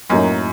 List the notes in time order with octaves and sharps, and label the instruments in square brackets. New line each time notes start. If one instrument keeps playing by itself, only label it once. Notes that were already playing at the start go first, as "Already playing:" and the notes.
[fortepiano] F#2 [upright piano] A2 F#3 A#3 D#4